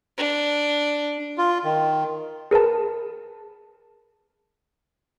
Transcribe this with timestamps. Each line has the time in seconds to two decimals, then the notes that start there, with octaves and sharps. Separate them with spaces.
0.18 D4
1.38 F4
1.64 D#3
2.51 G#4 A#4 B4 A5